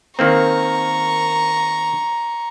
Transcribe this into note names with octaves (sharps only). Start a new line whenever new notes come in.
D#3 A#3 C4 A#5 C#6